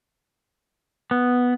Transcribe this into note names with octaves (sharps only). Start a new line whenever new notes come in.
B3